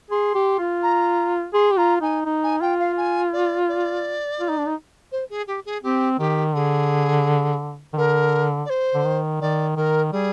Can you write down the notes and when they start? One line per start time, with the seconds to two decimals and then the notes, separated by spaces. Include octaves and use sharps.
0.11 G#4 C6
0.35 G4
0.59 F4
0.83 A#5
1.54 G#4 C6
1.72 G4
1.77 F4 A#5
2.01 D#4 G#5
2.26 D#4
2.43 G#5
2.61 F4 G5
2.79 F5
2.97 G#5
3.33 D5
3.69 D5
4.40 F4
4.49 D#4
4.58 D4
4.66 D#4
5.12 C5
5.29 G#4
5.47 G4
5.65 G#4
5.83 C4 G4
6.19 D#3 G4
6.55 D3 G#4
7.94 D#3
7.97 D3 A#4
8.65 D5
8.69 C5
8.95 D3
9.05 D#3
9.41 D#3 D5
9.76 D#3 A#4
10.12 G3 G#4